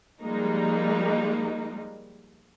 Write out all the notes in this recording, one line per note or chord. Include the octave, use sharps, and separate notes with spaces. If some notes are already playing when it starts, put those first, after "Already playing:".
F3 G3 G#3 A#3 D#4